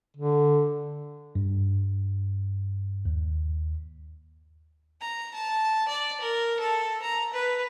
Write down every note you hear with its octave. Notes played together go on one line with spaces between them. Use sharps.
D3
G2
D#2
A#5
A5
D5
A#4
A4
A#5
B4